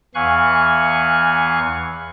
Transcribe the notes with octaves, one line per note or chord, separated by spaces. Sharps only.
E2 E3 F5 G#5 C#6 F#6